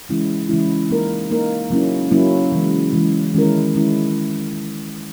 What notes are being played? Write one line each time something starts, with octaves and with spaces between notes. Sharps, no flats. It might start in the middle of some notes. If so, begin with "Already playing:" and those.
C#3 E3 G#3 C#4 E4
C#3 E3 G#3 C#4 E4
A#3 D#4 A#4
A#3 D#4 A#4
C#3 F#3 A#3 C#4 E4
C#3 F#3 A#3 C#4 E4
C#3 E3 G#3
C#3 E3 G#3
D#3 G#3 C#4 E4 A#4
D#3 G#3 C#4 E4